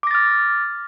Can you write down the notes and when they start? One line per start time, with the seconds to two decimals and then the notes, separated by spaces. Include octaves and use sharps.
0.03 D6
0.07 A#6
0.11 A6
0.15 F6